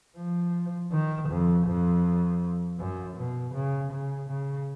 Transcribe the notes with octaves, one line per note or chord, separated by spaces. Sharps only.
F3
D#3
F2
F2
F#2
B2
C#3
C#3
C#3